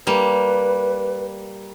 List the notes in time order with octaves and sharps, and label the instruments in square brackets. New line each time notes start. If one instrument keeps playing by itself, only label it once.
[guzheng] G3 A#3 [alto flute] B4